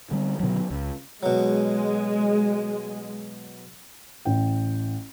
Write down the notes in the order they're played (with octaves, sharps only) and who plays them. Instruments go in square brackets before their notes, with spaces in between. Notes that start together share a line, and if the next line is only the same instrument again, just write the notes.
[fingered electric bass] D3 G3 C4
B2 D3 D#3 F#3
C#2
[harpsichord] B2 F#3 [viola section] G#3
[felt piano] A1 G5